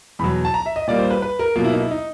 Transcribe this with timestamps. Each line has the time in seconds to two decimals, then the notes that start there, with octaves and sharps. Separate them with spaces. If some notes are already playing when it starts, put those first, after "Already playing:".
0.19 E2 B2 F#3 B5
0.45 A5
0.54 A#5
0.66 E5
0.76 D#5
0.87 A#2 G3 A#3 D5
0.99 C5
1.10 B4
1.22 B4
1.39 A#4
1.56 B2 F#3 A#3 F4
1.64 E4
1.73 D#4
1.82 E4
1.91 D#4